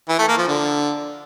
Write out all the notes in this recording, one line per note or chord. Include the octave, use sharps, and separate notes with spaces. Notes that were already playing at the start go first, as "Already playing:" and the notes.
E3
A3
A#3
F3
D3